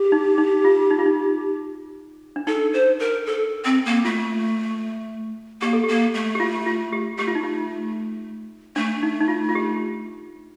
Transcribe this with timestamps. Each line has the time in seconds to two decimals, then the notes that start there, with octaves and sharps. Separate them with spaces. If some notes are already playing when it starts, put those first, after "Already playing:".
Already playing: G4
0.12 D#4
0.38 D#4
0.64 F4
0.90 D#4
0.99 F4
1.06 D#4
2.36 D4
2.47 D#4 A4
2.74 C5
2.99 A#4
3.26 A4
3.65 C4
3.86 A#3
4.05 A3 F4
5.61 A#3 G4
5.73 A4
5.84 A#3 G4
6.14 A3
6.35 G4
6.40 F4
6.66 F4
6.93 G4
7.18 A3 G4
7.27 F4
7.35 D#4
7.43 F4
8.76 A3 D4
9.03 D#4
9.21 D#4
9.28 F4
9.49 F4
9.55 G4